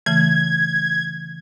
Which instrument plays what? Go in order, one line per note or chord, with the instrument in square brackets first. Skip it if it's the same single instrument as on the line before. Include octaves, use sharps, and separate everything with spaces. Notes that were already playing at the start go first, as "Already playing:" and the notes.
[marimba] C#3 E3 A3 [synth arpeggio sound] G#6